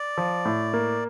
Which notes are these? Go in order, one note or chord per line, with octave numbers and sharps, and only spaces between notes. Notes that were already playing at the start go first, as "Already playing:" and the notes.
Already playing: D5
F3
A2
A#3